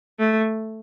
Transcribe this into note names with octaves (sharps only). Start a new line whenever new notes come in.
A3